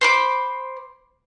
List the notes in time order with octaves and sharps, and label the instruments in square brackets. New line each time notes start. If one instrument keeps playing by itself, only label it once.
[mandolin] C5 B5 D6